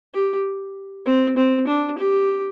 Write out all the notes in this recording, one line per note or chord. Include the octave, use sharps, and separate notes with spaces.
G4
C4
C4
D4
G4